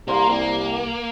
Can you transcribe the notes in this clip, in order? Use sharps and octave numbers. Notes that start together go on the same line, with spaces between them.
C2 A#3 A#4 F5 C6
C2 A#3